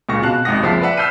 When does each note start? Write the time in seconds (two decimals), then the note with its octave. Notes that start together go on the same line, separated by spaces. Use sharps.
0.09 C#2 A#2 C#3 C#6 A#6
0.22 B2 F#4 F5 A5 F#6
0.45 G#1 C3 D#4 F#5 D#6 A#6
0.62 F#1 C#2 F3 E5 A5 C7
0.82 B4 D5 E5 F#5
0.97 E6 F6 G6 B6 C7 D#7